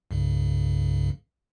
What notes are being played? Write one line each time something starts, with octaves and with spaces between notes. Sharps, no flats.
C2 G2 C#3